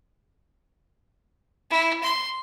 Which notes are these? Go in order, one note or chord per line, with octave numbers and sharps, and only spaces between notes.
E4
C6